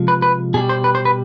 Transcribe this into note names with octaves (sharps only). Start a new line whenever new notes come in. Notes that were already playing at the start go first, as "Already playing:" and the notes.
Already playing: C3 F3 G#3
B4
B4
B2 G3 G#4
C5
B4
C5
B4